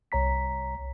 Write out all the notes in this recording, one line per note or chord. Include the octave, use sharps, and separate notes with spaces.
C2 C#5 A#5 B6